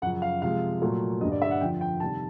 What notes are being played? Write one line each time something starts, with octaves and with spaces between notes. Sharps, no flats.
F#2 C#3 F3 F#5
F5
C3 F3 G#3 F5
A#2 F#3 A3
G2 D3 G3 D#5
D5
E5
F#5
F2 D3 F3 G5
G5
C3 D#3 G3 A5